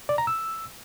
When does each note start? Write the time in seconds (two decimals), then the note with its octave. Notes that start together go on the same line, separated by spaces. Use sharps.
0.09 D5
0.18 A#5
0.27 E6